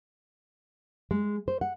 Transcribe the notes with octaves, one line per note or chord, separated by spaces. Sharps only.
G#3
C5
F#5